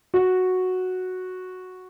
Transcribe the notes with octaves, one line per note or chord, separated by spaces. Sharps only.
F#4